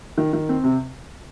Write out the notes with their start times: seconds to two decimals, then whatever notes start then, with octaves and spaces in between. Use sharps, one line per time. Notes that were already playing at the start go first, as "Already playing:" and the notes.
0.18 D#3
0.33 D#3
0.49 C4
0.64 C3